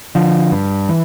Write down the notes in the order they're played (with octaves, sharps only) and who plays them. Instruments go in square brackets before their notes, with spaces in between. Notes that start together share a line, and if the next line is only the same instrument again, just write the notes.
[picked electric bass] D3 F3
G2
E3